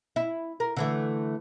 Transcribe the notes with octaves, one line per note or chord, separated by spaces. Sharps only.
E4
A#4
D3 E3 A3